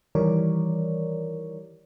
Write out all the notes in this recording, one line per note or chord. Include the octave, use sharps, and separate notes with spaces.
D#3 E3 G3 A#4 C#5 D5